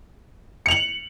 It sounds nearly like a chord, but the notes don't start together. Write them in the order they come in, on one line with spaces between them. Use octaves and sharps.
C#7 F7 F#7